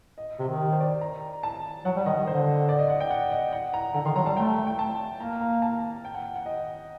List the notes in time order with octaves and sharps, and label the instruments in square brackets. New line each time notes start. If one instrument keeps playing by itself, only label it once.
[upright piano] D#5
[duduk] C3
D#3
[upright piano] C5
D5
A#5
A5
[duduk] F#3 [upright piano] F#5
[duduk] G3
[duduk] D#3 [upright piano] D#5
[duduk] D#3
[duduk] D3 [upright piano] C5
[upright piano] D5
D#5
F#5
G5
F#5
D#5
F#5
A#5
[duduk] D3 [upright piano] A#5
[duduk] D#3 [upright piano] C6
[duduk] F#3 [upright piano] A#5
[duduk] G3 [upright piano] A5
[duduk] A3 [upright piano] G5
[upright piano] G5
A5
[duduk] A#3 [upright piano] A#5
[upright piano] A#5
A5
G5
F#5
F#5
D#5